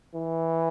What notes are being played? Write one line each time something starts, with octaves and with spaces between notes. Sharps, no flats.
E3